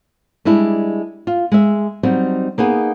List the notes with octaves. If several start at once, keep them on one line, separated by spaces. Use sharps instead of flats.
G3 G#3 D4 E4
F4
G#3 E5
F#3 G3 C4 D#4
A#3 B3 D#4 G#4